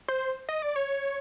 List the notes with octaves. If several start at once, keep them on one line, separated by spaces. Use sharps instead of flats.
C5
D#5
D5
C#5